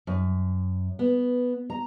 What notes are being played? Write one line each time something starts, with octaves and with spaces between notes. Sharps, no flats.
F#2
B3
A#5